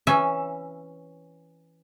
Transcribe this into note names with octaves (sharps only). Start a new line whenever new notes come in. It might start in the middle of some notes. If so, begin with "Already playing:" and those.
E3 C#4 E5